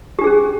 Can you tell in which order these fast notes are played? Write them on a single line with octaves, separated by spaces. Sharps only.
G4 D4 G#4 C#4